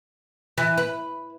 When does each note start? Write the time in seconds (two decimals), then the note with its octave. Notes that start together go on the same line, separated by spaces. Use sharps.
0.58 E3
0.78 B4